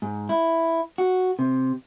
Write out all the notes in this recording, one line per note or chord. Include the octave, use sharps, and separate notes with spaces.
G#2
E4
F#4
C3